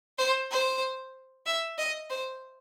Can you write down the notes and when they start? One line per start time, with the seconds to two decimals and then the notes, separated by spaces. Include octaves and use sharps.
0.18 C5
0.51 C5
1.46 E5
1.78 D#5
2.10 C5